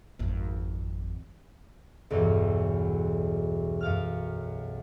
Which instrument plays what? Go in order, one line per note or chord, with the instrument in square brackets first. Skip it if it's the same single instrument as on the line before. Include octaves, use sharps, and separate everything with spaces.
[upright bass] G#1 F2
[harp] B1 E2 G2 F#3
F#2 F5 F6